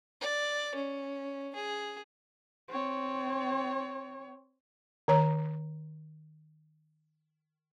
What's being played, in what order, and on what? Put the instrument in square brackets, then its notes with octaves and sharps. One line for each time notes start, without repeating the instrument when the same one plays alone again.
[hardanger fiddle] D5
C#4
G#4
[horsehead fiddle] C4 C#5
[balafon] D#3 C#5 A#5